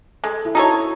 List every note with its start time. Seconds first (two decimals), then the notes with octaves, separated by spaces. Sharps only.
0.23 G#3 A4
0.45 E4
0.55 D#4 F#4 A4 C#5